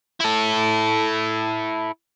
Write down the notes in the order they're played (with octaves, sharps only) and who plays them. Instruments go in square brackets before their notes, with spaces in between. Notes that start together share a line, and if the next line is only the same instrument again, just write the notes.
[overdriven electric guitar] E4 A4